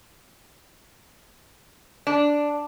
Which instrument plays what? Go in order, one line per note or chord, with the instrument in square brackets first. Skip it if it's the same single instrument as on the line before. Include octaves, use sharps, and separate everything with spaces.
[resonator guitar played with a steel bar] D4